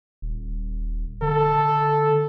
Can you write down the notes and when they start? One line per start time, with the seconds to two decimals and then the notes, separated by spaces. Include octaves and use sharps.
0.22 D#1
1.22 D3 A4